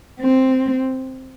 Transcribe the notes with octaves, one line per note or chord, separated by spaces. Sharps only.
C4